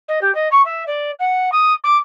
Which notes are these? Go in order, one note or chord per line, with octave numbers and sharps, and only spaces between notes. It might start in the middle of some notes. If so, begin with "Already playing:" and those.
D#5
G4
D#5
C#6
E5
D5
F#5
D#6
D6